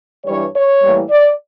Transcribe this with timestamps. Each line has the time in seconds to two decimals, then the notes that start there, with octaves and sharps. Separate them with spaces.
0.24 G2 E3 G3 C#5
0.54 C#5
0.81 A2 E3 G3 A#3
1.09 D5